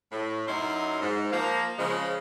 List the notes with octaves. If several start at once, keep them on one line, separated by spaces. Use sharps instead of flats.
A2
F#2 F#3 D#4 E4 C6
G#2
F3 A#3
C#3 F3 G#3